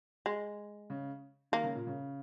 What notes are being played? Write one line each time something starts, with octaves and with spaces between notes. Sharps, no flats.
G#3
C#3
D#3 A#3
C#3
A#2
C#3